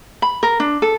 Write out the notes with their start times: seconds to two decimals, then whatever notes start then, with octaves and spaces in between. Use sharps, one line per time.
0.22 B5
0.43 A#4
0.60 D4
0.82 A4